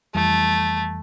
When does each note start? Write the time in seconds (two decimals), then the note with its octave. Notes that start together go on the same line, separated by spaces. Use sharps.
0.14 F2 E3 G3 A3